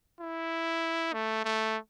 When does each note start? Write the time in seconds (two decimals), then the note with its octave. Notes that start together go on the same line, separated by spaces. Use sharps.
0.21 E4
1.13 A3
1.45 A3